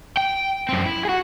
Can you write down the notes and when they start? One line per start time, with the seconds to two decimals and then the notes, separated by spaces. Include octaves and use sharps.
0.17 G5
0.69 F#2 C4
0.86 E4
1.05 F#4 G#4